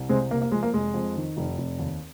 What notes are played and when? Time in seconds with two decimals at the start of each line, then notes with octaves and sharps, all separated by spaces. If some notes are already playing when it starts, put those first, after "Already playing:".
Already playing: C2
0.09 C3 G#3 C4
0.30 C3 A#3
0.41 A#3
0.52 F3 G#3
0.63 A#3
0.74 F1 G#3
0.94 F2
1.16 D#3
1.37 F1
1.58 F1
1.79 D#2